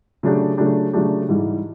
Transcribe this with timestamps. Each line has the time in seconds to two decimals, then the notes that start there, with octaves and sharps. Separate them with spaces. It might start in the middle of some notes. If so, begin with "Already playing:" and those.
0.23 C#3 F#3 A3 D4 G4
0.58 C#3 F#3 A3 D4 G4
0.93 C#3 F#3 A3 D4 G4
1.29 G#2 E3 G3